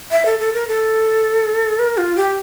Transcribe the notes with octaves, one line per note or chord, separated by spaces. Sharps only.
E5
A4
A4
A#4
A4
A#4
F4
G4